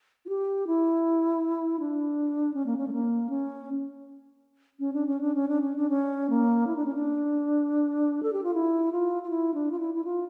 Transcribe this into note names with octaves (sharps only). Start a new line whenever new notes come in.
F4
G4
E4
D4
C#4
A#3
C#4
A3
A#3
C#4
C#4
D4
C#4
D4
C#4
D4
C#4
D4
C#4
A#3
E4
D4
C#4
D4
A4
G4
F4
E4
F4
F4
E4
D4
F4
E4
E4
F4